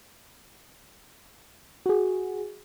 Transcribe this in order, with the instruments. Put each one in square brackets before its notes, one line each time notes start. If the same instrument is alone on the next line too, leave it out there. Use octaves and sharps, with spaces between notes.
[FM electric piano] F#4 G#4